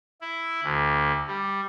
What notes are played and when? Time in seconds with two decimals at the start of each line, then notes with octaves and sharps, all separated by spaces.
0.21 E4
0.63 D2
1.27 G3